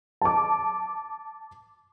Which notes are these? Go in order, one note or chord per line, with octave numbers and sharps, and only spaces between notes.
A5 D6